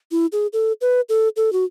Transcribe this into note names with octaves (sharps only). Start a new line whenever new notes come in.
E4
G#4
A4
B4
A4
A4
F#4